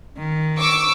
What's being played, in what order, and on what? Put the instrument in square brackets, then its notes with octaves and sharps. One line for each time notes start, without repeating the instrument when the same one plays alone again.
[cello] D#3
[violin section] C#6 D6 E6